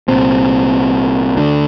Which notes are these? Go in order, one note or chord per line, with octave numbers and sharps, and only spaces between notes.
C2 A#2 C4
D2 D3 D4